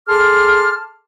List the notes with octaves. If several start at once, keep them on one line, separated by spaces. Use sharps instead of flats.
G#4 A4 A5 C6 D6 F6